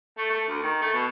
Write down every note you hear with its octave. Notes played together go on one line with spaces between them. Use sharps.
A3
A3
D2
D#3
A3
B2